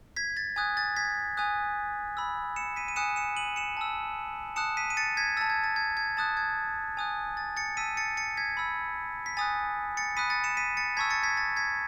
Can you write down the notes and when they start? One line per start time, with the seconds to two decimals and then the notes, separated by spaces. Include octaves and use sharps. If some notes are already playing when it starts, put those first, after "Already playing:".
0.16 G#6 B6
0.37 A6
0.56 G#5 D#6 F#6 G#6
0.77 A6
0.97 G#6 B6
1.37 G#5 D#6 F#6
2.17 B5 E6
2.56 C#7 E7
2.76 B6 D#7
2.88 D#7
2.96 G#5 D#6 F#6 C#7 E7
3.16 C#7 E7
3.36 D#7 F#7
3.56 C#7 E7
3.77 A5 E6
4.56 A5 D#6 F#6 C#7 E7
4.77 B6 D#7
4.90 D#7
4.97 A6 C#7
5.17 G#6 B6
5.37 A5 E6 A6
5.50 G#6
5.64 A6
5.76 G#6
5.97 G#6
6.17 A5 D#6 F#6 A6
6.37 G#6
6.97 G#5 D#6 F#6
7.37 A6
7.57 A6 C#7
7.77 A5 E6 B6 D#7
7.97 A6 C#7
8.17 A6 C#7
8.37 G#6 B6
8.57 B5 E6
9.26 B6
9.37 G#5 D#6 F#6 A6
9.97 A6 C#7
10.17 B5 D#6 F#6 B6 D#7
10.30 A6 C#7
10.44 C#7 E7
10.57 B6 D#7
10.77 A6 C#7
10.97 A5 C#6 E6 G#6 B6
11.10 A6 C#7
11.23 G#6 B6
11.37 A6
11.56 G#6 B6